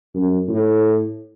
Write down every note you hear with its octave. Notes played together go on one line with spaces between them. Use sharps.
F#2
A2